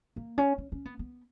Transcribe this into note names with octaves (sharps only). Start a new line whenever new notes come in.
A#3
C#4
C#4
C#4
B3
B3